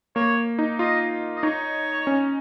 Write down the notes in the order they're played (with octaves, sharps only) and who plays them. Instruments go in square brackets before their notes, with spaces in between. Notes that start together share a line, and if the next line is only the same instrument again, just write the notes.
[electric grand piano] A#3 [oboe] C#5
[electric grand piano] D#4
[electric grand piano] F4 [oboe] D#5
[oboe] D#5
[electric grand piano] D#4 [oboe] C#5
[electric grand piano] C#4